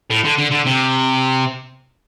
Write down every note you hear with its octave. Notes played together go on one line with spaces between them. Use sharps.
A2
D3
D3
D3
C3